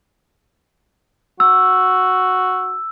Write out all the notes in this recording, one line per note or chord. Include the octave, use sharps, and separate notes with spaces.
F#4 E6